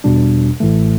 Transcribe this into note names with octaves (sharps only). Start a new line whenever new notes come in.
E2 B2 G3 D4
A1 A2 E3 A3